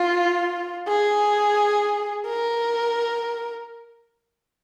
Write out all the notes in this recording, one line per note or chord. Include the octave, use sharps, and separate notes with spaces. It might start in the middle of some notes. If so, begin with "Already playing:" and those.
Already playing: F4
G#4
A#4